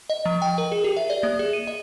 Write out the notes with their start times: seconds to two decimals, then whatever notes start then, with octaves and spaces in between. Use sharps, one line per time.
0.10 D#5
0.25 F3
0.42 G5
0.58 A#4
0.72 G#4
0.84 G4
0.97 E5
1.10 D5
1.23 A#3
1.39 G#4
1.53 D#7
1.67 D#5